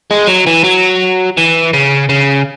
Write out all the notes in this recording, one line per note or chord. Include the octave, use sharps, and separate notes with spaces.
G#3
F#3
E3
F#3
E3
C#3
C#3